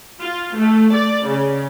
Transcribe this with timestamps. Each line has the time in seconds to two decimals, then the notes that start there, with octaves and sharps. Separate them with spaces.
0.20 F4
0.57 A3
0.94 D5
1.27 C#3